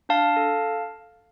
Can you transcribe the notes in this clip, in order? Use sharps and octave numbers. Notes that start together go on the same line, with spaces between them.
D4 F5 A5
A4